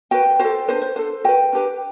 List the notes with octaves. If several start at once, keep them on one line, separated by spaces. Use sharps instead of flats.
F#4 B4 G5
F#4 A4 C5
D4 F#4 B4 C5
C5
D4 A4 C5
F#4 B4 G5
D4 G4 B4